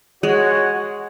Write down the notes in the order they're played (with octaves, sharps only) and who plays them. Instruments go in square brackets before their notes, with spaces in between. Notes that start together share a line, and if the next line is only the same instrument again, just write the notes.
[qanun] G#3 [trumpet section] F#4 C#5 F#5